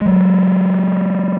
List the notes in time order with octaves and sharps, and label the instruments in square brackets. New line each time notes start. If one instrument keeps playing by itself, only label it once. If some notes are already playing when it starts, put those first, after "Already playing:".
[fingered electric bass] F#3 G#3